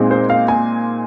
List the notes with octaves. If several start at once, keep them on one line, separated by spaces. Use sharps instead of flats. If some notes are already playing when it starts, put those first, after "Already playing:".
Already playing: A#2 G#3 C4 D#4
C5
F5
G#5